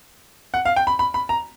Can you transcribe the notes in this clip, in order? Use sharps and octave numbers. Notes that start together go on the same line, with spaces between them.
F#5
F5
G5
B5
B5
B5
A#5